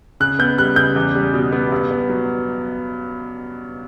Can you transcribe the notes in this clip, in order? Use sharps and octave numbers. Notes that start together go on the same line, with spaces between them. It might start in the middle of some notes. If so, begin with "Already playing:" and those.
C#3 F#6
B3 G6
G3 F#6
C#3 G6
E2
G3
B2
B3
G2
B3
F#3